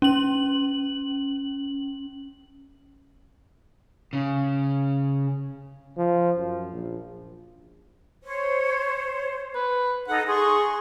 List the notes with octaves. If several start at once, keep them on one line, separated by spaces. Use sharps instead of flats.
C#4 F#7
C#3
F3
F#2
A#1
C5 C#5
B4
D#4 A4 F#5
G#4 C6 C#6